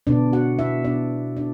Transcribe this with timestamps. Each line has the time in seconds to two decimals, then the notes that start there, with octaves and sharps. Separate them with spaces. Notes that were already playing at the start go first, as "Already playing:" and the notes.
0.07 B2 B3 D4 D5
0.33 F#4 F#5
0.59 E4 E5
0.84 B2 B3 D4 D5
1.37 D4 D5